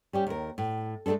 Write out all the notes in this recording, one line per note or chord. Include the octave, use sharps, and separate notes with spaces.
G3 C#4 G4
D#2 A#4
A2
G#3 A3 B3 D4 A4